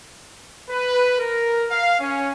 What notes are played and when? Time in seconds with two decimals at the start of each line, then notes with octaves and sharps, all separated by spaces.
0.69 B4
1.19 A#4
1.70 F5
1.99 C#4